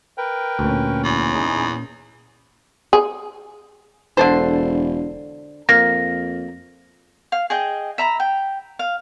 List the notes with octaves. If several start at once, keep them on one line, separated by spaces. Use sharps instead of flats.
A#4 B4 G5
D2 A#2 C#4
E2
D#4 G#4
G#4
E1 D3 A4 C5
F2 A#3 A#6
F5
G#4 D#5 G5
E5 A#5 B5
G5
F5